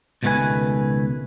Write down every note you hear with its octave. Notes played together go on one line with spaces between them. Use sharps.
C#2 B2 D#3 A3 B4 G#5